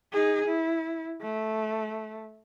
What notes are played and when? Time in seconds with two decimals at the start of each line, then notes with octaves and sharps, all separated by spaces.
0.13 D#4 G#4
0.47 E4
1.22 A3